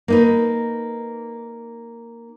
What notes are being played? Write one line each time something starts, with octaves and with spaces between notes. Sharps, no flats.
A#3 D#4 B4